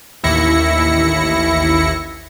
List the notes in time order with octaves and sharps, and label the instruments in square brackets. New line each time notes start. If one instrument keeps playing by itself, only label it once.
[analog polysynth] A1 D#2 E4 A#6 C#7